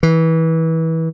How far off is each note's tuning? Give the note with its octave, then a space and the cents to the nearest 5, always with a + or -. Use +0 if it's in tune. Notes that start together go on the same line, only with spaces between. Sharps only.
E3 -25